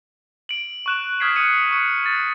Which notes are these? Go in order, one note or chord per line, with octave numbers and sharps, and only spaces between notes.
D7 F#7
C#6 F#6 E7
D#6 F6 G#6 B6 C7 D7
D#6 C#7 D#7
C#6 C#7
A6